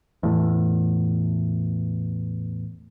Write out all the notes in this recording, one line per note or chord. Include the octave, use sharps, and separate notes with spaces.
E2 A2